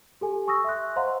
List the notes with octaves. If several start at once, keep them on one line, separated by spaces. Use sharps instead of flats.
G4 A4 G#5
G#5 C#6 D#6 E6 A#6
E5 C6 F#6
C5 D#5 F5 F#5 A#5 C6